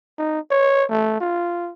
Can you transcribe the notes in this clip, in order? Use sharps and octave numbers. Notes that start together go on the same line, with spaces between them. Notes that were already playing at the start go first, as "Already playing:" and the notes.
D#4
C#5
A3
F4